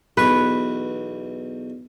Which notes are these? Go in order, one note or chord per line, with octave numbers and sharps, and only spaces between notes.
B1 E2 B4 C#6